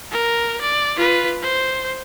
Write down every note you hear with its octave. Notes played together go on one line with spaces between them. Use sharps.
A#4
D5
F4 B4
C5